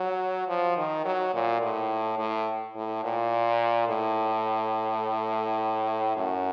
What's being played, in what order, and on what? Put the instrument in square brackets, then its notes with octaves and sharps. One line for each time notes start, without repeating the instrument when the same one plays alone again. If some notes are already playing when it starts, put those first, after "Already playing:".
Already playing: [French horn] F#3
F3
D#3
F#3
A#2
A2
A2
A2
A#2
A2
F#2